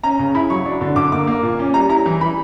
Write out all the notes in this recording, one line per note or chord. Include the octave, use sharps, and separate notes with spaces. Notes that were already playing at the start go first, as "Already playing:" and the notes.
C#4 A#5
C#3
E4 B5
F#3 C#6
D4
D3
D3 D6
A#3 D6
A#3
A#2
C#4
G3 A#5
E4 A#5
E3
E3 B5